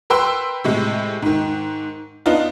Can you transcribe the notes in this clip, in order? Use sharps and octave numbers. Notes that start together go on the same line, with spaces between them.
A#4 B4 G5 C6 E6
A2 C3 G#3
G#2 D#3
B3 D4 D#4 F4